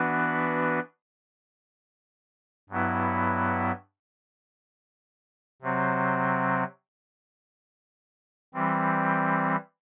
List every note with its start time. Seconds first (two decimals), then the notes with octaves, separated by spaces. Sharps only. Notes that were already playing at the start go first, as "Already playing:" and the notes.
Already playing: E3 B3 D4 F#4 B4
2.69 G2 F#3 B3 E4
5.62 C3 F#3 C4
8.54 E3 G3 C4